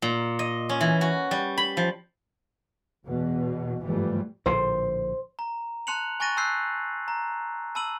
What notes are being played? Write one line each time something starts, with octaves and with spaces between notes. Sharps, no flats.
A#2
D#5
C#4
E3
F#4
G3
B5
F3
E2 B2
G1 G#2 E3 F3 G3 A3
A#1 A2 D3 C5
A#5
A5 C6 F#6 C#7 F7 F#7
G#5 C#6 F#6 A6 A#6 D#7
A5 C6 E6 F#6 G6 C7
A#5
A5 B5 E6 D#7 F#7